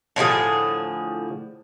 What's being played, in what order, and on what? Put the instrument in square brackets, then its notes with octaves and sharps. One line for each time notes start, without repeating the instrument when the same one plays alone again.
[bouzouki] A2 D3 F3 G#4